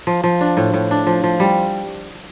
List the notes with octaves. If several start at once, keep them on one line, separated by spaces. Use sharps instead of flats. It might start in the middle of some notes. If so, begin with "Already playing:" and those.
F3
F3
D4
A2
A2
D4
F3
F3
G3